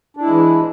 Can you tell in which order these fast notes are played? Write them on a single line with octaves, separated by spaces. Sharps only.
D4 E4 G#3 E3